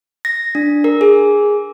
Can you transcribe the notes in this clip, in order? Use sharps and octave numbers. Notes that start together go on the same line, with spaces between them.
A#6
D4
A#4
G#4